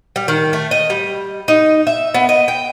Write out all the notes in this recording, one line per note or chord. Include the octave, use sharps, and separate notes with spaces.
G3
D#3
A3
D#5
G3
D#4
E5
B3
D#5
G5